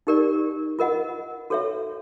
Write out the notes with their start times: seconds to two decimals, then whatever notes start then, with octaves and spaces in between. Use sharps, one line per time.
0.07 D#4 G4 A#4 D5
0.79 F4 A#4 D#5 F#5
1.50 F#4 A4 C#5 E5